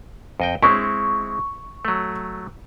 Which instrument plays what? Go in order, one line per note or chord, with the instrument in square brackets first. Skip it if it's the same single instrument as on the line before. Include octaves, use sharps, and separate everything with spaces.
[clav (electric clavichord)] F2 D#5 G5
[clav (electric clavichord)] G#3 C4 E4 [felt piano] C#6
[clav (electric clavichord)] F#3 A3